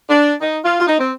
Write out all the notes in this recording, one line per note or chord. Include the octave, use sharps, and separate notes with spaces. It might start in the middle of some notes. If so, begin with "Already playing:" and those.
D4
D#4
F4
F4
D#4
C4